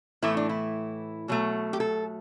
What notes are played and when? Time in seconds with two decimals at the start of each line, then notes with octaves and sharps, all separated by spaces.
0.22 A2 E3 A3 E4
0.37 D4
0.49 E4
1.28 B2 F#3 A3
1.73 G4
1.80 A4